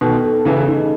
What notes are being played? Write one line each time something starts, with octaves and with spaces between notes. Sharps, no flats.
B2 D#3 A4
A4
C#3 E3 A3
C#3 E3
D#4